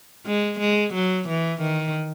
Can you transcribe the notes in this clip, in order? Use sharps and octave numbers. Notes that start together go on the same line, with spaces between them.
G#3
G#3
F#3
E3
D#3